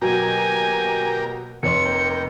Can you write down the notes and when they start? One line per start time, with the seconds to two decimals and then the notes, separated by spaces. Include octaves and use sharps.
0.02 B2 F#3 A#3 G4 A#4 G#5
1.63 F1 C#5 C6 C#7
1.85 A#3 G5